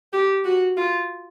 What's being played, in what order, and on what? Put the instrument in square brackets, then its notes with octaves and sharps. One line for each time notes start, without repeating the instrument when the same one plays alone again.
[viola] G4
F#4
F4